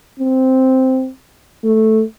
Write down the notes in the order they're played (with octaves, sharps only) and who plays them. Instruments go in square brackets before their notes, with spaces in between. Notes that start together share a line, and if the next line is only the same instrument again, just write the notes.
[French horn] C4
A3